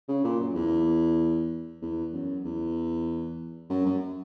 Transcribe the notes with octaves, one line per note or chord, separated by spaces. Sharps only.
C#3
A#2
F#2
E2
E2
F#2
E2
F#2
F#2